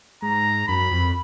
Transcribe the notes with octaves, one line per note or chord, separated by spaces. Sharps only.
G#2 A#5
F#2 B5
F2